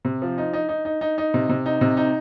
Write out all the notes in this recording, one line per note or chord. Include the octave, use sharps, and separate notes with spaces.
C3
F3
D#4
D#4
D#4
D#4
D#4
D#4
C3
C3
D#4
C3
D#4